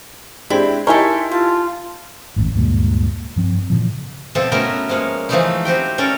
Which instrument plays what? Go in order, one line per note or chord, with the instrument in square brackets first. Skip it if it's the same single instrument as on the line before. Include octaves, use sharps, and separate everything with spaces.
[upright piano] G#3 D4 G4 [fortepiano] C4 [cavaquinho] E4
[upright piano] D#4 E4 G4 [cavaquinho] A4 G#5 C6 [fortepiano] A#4 C#5
[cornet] F4 [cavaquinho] A5
[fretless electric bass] G#1 E2 A2 C#3
D2 G2 A#2 G#3
G2 F3 C4
A#2 C#3 E3 F3
[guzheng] B2 F3 C4 A4 E5
A3 B3 C#4 E4 F#4 A#4
F3 G#3 A#3 C#5
E3 F3 G#3 A3 D#4 E4
C4 F#4 G4 G5
C#4 A4 A#4 C#5 D5